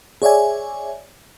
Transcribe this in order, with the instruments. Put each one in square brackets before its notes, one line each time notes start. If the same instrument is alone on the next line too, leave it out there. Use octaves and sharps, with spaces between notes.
[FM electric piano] G#4 C#5 D5 E5 G#5